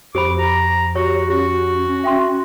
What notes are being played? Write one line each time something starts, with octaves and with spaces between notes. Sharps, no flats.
F2 G4 C5 B5 D6
A#5
F#4 G4 C#5
C#4 F#4
E5 G5 C6